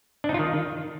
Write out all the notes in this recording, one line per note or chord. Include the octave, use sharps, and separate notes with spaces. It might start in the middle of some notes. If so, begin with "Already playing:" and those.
D4
D#4
F4
D#3